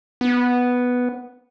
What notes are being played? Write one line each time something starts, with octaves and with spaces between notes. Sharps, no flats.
B3